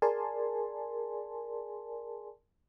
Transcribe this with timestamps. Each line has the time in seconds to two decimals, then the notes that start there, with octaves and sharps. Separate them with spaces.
0.02 G#4 A#4 D5 G#5 A5 C6